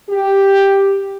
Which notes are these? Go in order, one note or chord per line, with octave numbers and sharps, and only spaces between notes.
G4